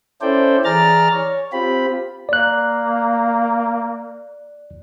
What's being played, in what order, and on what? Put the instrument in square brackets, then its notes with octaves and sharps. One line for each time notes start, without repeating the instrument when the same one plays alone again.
[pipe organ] C#4 E4 A4 C5 D5 G5
E3 G#4 D5 A#5 F6 A6
C#5
C4 F4 G4 B5
[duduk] A#3 [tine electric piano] D5 F#6